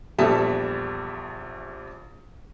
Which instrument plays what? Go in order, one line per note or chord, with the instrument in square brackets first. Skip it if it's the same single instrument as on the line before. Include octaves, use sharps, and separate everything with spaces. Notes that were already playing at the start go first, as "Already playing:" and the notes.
[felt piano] A#1 E2 G3 A4 E5